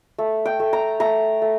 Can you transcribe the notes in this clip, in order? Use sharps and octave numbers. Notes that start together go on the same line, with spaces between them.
A3
G5
A3
A#5
A3 A#5
A3